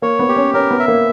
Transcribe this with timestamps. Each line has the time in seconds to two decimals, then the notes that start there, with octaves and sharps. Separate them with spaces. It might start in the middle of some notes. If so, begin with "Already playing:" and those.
0.02 A#3 C#5
0.19 B3
0.29 G4
0.36 C#4
0.54 C#4 A#4
0.71 B3
0.80 E5
0.88 A#3